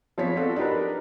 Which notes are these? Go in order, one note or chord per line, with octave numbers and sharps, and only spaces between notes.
F3 B3 C4 G#4 C#5 B6
C4 F4 F#4 A4 D5
D4 D#4 G4 A#4 B4